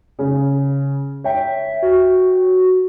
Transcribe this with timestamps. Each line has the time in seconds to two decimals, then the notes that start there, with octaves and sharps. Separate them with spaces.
0.19 C#3
1.24 C#5 E5 G5
1.83 F#4